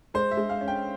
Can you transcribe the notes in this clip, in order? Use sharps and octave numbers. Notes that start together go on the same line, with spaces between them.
G#3 C5
E5
G#3
F5
C#4
G5